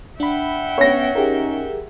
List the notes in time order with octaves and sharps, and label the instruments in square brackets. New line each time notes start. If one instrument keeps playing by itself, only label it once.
[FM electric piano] D4 B5 [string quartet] E5 F#5 G5
[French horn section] B3 C#4 [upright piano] C#5 A#6
[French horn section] C#4 D#4 [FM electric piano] G4 G#4 A#4